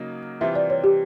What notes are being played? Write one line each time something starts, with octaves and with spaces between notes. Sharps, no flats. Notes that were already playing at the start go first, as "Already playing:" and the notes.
Already playing: C#3 F#3 A#3 D#4
C3 E3 G3 C4 F4 E5
D5
C#5
G4